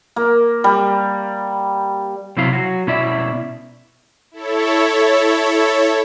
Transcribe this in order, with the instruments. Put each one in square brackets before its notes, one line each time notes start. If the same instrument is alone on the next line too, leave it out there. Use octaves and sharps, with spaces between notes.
[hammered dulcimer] A#3
G3
[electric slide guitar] C3 F#3 E4 F5
F#3 F#4
B2 C#4 E4 D5 E5
[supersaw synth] E4 A4 C#5